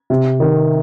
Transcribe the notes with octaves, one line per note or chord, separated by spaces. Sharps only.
C3
D#3